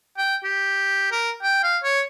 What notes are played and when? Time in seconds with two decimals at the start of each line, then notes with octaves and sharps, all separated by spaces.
0.18 G5
0.44 G4
1.12 A#4
1.43 G5
1.64 F5
1.83 C#5